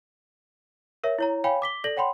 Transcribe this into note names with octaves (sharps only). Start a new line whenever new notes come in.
A#4 C#5 E5
E4 C#5 A#5
C#5 F5 G5 G#5 B5
D6 B6 G7
A4 D5 A#6 F#7
C#5 F#5 G5 B5 C6